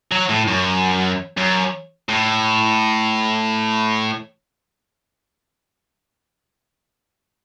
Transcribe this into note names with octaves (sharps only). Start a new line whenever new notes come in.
F#3
A2
F#2
F#2
A2